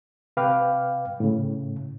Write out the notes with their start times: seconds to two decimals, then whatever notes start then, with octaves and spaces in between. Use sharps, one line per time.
0.37 C3 B4 F5 G5 D6 F6
1.20 A2 C#3